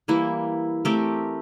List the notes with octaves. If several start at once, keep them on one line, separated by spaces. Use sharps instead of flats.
E3 G3 A#3 E4
A3 C4 G4 A#4